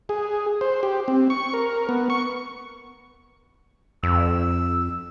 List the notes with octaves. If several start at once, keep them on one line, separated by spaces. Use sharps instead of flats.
G#4
C5
G4
C4
C#6
A#4
B3
C#6
F2 E6